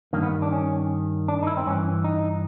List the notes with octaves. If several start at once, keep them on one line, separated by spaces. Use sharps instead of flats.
G2 D#3 A#3
B3
D4
C#4
D4
D#4
E4
C4
G2 E3 C#4
D#4